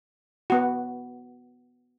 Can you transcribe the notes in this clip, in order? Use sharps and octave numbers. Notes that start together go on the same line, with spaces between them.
B3 F#4